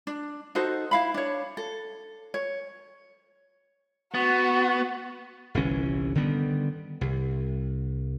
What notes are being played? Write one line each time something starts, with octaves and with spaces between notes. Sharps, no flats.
D4
D#4 F#4 A4 C5
E4 F5 B5
D4 C#5
A4
C#5
B3 F#4
G1 C2 E3 C#4
D3 D#3 G3 B3
C2